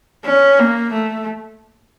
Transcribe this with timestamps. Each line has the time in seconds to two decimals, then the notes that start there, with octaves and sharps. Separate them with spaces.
0.25 C#4
0.59 A#3
0.92 A3